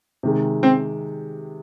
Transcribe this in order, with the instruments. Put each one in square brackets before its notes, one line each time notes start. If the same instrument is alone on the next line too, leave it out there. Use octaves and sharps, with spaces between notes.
[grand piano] C3 D#3 G#3
[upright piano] C4